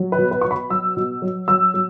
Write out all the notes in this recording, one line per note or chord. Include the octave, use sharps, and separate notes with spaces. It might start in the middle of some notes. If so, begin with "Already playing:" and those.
Already playing: F#3
B4
B2
B4
B2 C#6
B5
F#3 E6
B2
F#3
F#3 E6
F#3